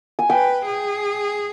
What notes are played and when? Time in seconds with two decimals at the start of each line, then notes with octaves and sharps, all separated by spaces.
0.19 G#5
0.30 B4 G5
0.66 G#4